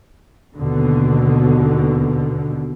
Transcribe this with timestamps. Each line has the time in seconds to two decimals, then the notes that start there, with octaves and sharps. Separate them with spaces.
0.58 D#2 B2 D3